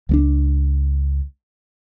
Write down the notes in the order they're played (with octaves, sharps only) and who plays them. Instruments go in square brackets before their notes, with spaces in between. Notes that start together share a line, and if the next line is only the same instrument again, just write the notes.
[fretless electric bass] C#2 G#3 D4